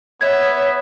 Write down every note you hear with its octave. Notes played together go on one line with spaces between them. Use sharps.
B3 C#5 E5 G#6